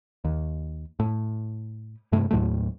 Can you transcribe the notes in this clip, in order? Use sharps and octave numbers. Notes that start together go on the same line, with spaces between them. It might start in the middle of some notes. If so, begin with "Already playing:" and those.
D#2
A2
G2 C3 A3
D#2 A2 F#3 A3